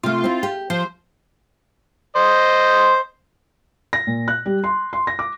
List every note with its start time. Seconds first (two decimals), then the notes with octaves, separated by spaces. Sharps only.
0.03 C3 A3 F4
0.24 C4 E4
0.43 G4
0.70 F3 C5
2.16 C5 D#5
3.93 A#6
4.07 A#2
4.28 F#6
4.46 G3
4.64 C6
4.93 C6
5.07 A#6
5.19 D6